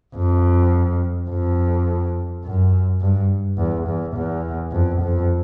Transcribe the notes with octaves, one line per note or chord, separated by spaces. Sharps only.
F2
F2
F#2
G2
E2
E2
E2
F2
F2